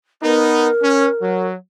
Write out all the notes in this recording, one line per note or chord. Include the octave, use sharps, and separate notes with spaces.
B3 D#4 A#4
C#4
F#3